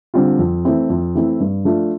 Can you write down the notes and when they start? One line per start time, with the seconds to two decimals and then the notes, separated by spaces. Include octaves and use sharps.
0.14 D3 G3 C4 F4
0.39 F2
0.65 E3 A3 C4 E4
0.90 F2
1.15 E3 A3 C4 E4
1.40 G2
1.65 F3 A3 D4 F4